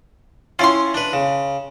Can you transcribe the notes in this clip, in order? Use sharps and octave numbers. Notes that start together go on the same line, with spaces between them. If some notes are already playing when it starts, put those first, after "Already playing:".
C#4 E4 F4 C#5 G5 C6
D4 B4
C#3